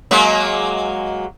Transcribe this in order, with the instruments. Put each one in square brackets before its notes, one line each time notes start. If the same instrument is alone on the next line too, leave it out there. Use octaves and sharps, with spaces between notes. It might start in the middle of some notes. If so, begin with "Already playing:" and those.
[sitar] F#3 G#3 A#3